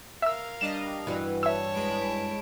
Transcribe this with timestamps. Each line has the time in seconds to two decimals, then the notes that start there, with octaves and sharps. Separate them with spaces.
0.22 A#4 E5 F5 E6
0.61 G3 D4 D#5 E7
1.07 G2 E3 F#4
1.43 C#5 E5 A5 E6
1.74 G#3 B5 D7